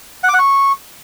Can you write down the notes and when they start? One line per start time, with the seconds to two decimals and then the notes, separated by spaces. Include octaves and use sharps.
0.24 F#5
0.29 D6
0.34 F#5
0.39 C#6